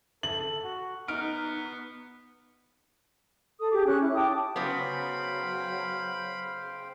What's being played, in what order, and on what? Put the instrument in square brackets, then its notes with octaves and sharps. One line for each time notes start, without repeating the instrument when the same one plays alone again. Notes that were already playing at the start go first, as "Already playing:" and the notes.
[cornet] A4 [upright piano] F#7
[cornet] F#4
[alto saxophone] B3 [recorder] D#4 [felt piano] F6 D7
[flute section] A4 D#6
G4 G#4 D6
C#4 F#6
E4
G5 A5 D6 D#6
[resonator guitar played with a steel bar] C#3 B3 [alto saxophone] F#3 [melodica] C5 F5 G5 [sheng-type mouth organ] B5